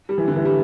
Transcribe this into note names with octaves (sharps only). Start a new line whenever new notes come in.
G3
E3
D3
E3
G3